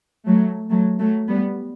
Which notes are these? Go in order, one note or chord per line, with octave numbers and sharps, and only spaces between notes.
F#3 A3
F#3 A3
F#3 A3
G3 B3